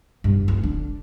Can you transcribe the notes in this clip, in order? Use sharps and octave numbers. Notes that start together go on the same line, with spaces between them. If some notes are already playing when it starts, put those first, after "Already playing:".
G2
D2
D4